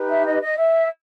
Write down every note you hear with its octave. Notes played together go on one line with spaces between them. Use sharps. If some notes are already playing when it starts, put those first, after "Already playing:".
Already playing: D#4 G4 B4
E5
D#5
D#5
E5